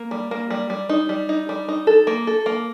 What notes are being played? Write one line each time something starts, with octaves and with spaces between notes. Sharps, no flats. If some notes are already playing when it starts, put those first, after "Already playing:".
Already playing: A#3
G3
A#3
G3
G3
D#4
G3
D#4
G3
D#4
A4
A#3
A4
A#3